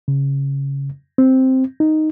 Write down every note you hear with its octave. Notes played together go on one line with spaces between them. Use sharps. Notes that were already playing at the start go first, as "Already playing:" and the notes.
C#3
C4
D#4